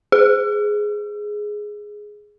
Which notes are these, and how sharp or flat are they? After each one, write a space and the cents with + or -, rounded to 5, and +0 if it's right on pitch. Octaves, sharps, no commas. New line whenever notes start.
G#4 +5